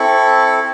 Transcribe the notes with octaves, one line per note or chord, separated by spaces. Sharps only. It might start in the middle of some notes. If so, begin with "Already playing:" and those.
Already playing: C4 E4 A4 B5 C#6